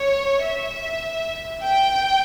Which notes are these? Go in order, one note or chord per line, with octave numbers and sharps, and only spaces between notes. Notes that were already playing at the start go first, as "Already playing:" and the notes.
Already playing: C#5
E5
G5